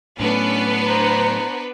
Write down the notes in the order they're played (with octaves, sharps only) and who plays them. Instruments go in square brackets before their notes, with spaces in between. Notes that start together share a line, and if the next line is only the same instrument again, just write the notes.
[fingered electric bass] A2 F#3 A3 [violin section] B3 D4 B4 [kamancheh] C#4
[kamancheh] C5 A#5